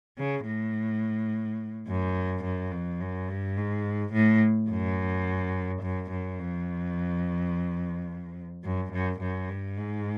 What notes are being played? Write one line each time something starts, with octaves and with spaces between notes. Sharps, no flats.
C#3
A2
F#2
F#2
F2
F#2
G2
G#2
A2
F#2
F#2
F#2
F2
F#2
F#2
F#2
G2
G#2